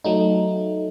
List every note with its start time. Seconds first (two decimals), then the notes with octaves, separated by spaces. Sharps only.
0.04 F#3 A3 D#4